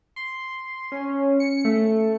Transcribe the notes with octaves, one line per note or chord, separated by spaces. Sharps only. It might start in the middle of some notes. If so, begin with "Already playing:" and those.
C6
C#4
C#7
A3